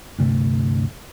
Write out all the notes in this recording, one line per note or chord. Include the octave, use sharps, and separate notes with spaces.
D2 G2 C3 A3